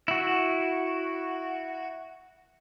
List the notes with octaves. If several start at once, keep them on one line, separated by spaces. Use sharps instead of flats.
E4 F#4